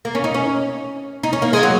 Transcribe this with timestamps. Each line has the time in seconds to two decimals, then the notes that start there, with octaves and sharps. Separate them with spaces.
0.05 A#3
0.15 C#4
0.24 D#4
0.34 C#4
1.23 D#4
1.33 C#4
1.42 A#3
1.53 G#3
1.63 F#3